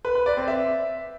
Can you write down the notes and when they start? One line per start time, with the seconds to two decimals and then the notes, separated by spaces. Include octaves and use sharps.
0.05 B4
0.15 B4
0.26 D5
0.37 C4
0.48 E5